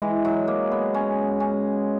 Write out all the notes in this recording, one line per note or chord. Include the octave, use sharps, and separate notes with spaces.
E3 G#3
F#3
A#3
B3
C#4
C#4